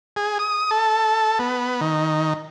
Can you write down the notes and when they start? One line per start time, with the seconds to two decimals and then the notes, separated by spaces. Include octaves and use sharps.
0.16 G#4
0.39 D#6
0.71 A4
1.39 B3
1.81 D#3